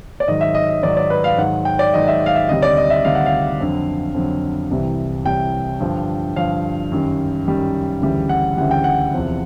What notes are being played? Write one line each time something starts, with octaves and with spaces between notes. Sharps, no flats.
D5
G#2 D#3 F#3 D#5
E5
D#5
D#5
G#2 D#3 F#3 D5
D5
B4
F5
G#2 D#3 F#3 F#5
G5
D5
G#2 D#3 F#3 D#5
E5
F5
E5
D2 C3 D#3 G3 D#5
D5
D#5
E5
D2 C3 D#3 G3 F5
F#5
F5
F2 D3 F#3
F2 D3 F#3
C2 C3 E3 G3
C2 C3 E3 G3 G5
G2 D3 F3
G2 D3 F3 F5
F#2 D#3 G3
F#2 D#3 G3
D2 C#3 E3 G3
F#5
D2 C#3 E3 G3 F#5
G5
F#5
E2 C3 F3